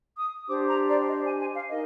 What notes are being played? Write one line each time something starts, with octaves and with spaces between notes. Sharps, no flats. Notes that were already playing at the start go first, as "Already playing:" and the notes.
D#6
D4 G4 C5 D6
A#5
D5
D#5
G#5
G#5
F5
D#4 A#4 D#5